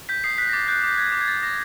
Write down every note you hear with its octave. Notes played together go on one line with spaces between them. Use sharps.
G6 B6
D#6 C7
F#6 B6
A#6
D6 A6
F#6 G6
D6 G6
F#6 G#6
D6
G#6
F#6 A6
D6 A#6